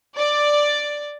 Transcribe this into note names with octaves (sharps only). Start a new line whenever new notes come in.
D5